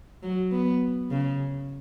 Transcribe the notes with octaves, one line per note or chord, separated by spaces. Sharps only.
F#3
B3
C#3